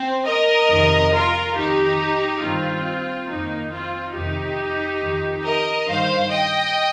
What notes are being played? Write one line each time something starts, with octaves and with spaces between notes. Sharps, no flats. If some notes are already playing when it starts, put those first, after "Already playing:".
Already playing: C4
A#4 D#5
F2 C3 D#3
F4 A#4
F2 D#3 D#4 G4
G2 D#3 C4 F4
F2 D#3 A#3 D#4
C4 F4
F2 C3 D#3 D#4 G4
F2 D#3
A#4 D#5
G2 D#3 C5 F5
D#5 G5